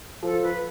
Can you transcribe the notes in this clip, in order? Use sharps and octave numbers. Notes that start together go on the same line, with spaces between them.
F3 A4
B4